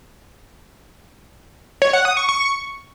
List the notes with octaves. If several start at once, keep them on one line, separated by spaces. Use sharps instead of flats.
C#5
F#5
D#6
C#6
C#6